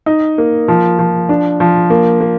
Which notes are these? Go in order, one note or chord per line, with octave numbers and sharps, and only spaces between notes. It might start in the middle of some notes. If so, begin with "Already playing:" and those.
D#4
A#3
F3
F3
D4
F3
A#3
A#3